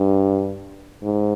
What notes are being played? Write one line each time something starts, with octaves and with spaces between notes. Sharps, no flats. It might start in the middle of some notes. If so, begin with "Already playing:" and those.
Already playing: G2
G#2